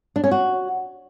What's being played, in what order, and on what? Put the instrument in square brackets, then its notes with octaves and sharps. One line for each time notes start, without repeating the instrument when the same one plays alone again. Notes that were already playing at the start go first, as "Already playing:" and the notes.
[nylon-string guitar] D4
C#4
F#4